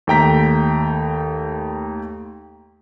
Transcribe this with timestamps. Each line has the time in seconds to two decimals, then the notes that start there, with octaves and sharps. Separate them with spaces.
0.07 D#2 A3 G5 A#5 B6